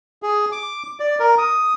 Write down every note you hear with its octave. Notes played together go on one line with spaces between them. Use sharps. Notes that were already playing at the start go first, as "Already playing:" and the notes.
G#4
D6
D5
A#4
D#6